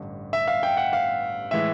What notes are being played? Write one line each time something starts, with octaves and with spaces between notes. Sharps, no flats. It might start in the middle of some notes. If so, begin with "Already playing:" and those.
Already playing: A1 G2 D3
E5
F5
G5
F#5
F5
A2 E3 G#3 E5